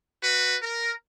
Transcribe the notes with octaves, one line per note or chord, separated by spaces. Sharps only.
F#4 B4
A#4